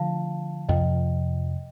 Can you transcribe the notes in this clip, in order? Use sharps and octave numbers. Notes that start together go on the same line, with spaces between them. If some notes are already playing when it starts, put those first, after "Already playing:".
Already playing: D3 F3 A3 F5 A5
F2 C3 F3 D#5 G5